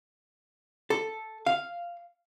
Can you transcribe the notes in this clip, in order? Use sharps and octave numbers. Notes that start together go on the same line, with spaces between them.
A4
F5